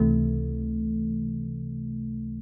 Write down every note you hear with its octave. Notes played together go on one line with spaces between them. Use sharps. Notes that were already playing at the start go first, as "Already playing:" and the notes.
Already playing: C#2 C3 E3 A3